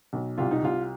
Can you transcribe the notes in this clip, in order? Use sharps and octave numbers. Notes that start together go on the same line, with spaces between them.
B1
C2 F4
D#4
C2 F4